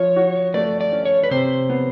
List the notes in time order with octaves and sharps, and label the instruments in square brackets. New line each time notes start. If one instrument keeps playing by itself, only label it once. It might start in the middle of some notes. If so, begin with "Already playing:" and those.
Already playing: [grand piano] F3 [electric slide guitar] C#5
[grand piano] F#4
[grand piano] A3 [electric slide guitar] D5
[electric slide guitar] D5
[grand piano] C#4
[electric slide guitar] C#5
B4
[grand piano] C3 [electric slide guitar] C5
[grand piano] B3